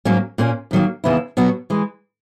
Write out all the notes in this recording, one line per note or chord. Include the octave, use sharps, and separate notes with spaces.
G#2 F#3 A#3 C#4
A#2 A#3 C#4
F#2 D#3 F#3 A#3
D#2 C#3 E3 B3 E4
B2 F#3 B3 F#4
E3 G#3